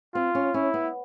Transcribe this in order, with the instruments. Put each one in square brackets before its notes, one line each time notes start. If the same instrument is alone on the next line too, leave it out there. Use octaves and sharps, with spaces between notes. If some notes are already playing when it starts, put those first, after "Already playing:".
[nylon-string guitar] C4 [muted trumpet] F4
[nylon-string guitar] C#4
[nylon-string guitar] C#4 [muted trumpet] E4
[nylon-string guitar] B3